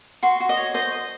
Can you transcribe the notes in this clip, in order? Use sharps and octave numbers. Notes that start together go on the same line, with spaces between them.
F#4 C6
F#4
D#5
C#5
C5 D#5
D#5